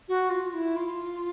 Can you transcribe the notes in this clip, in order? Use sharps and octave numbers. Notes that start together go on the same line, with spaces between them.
F#4
F4
E4
F4